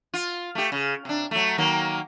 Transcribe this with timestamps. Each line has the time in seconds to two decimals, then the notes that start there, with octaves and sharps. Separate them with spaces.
0.14 F4
0.55 A3 G4
0.72 C#3
1.05 C3 D4
1.31 F#3 A3
1.58 D#3 F#3 A#3